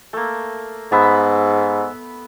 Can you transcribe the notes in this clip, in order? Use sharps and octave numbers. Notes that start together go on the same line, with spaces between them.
A3 A#3
G#2 B3 E5 B5